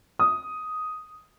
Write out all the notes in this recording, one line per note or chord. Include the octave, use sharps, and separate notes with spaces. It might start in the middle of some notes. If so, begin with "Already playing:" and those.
D#6